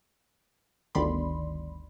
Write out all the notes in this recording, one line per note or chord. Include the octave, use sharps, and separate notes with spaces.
G1 D2 D#3 D5 B5 C6